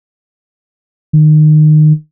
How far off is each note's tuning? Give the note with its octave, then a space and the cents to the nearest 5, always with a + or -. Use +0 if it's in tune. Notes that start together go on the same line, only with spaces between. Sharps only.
D#3 -25